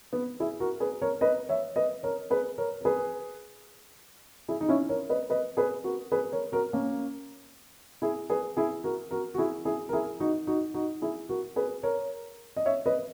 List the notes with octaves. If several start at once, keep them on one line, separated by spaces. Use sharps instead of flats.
B3
E4 G#4
F#4 A#4
G#4 B4
A#4 C#5
B4 D#5
C#5 E5
B4 D#5
A#4 C#5
G#4 B4
A#4 C#5
A#4
G#4 B4
E4 G#4
D#4
C#4 E4
A#4 C#5
B4 D#5
B4 D#5
G#4 B4
F#4 A#4
G#4 B4
A#4 C#5
F#4 A#4
A#3 C#4
E4 G#4
G#4 B4
E4 G#4
F#4 A#4
F#4 A#4
F#4
E4 G#4
E4 G#4
A#4
E4 G#4
D#4 F#4
D#4 F#4
D#4 F#4
E4 G#4
F#4 A#4
G#4 B4
A#4 C#5
D#5
C#5 E5
B4 D#5